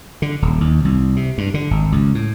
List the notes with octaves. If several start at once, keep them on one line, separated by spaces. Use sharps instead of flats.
D3
D#1
D#2
C2
C3
G2
D3
G#1
C#2
A2